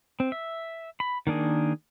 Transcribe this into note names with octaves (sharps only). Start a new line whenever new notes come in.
C4
E5
B5
D#3 A#3 D4 G#4